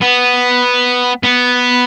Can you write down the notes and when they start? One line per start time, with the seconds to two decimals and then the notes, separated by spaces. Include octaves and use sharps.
0.02 B3
1.23 B3